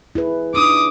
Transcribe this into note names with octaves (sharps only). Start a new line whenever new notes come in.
E4 G#4 B4
D4 D#4 D6 D#6